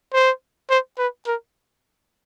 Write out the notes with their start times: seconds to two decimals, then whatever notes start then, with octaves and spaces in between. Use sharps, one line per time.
0.13 C5
0.70 C5
0.98 B4
1.26 A#4